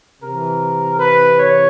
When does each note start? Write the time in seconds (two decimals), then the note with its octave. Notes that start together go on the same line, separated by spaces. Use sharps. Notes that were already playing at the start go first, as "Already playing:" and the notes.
0.22 C3 E3 A#4
0.99 B4
1.37 C#5